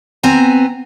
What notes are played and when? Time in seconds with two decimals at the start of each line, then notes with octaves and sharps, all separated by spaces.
0.23 B3 C4 G#5 A#5